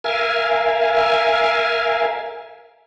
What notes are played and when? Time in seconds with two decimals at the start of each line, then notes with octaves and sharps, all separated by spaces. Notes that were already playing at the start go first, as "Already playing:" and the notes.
0.04 A#4 E5 F5 G#5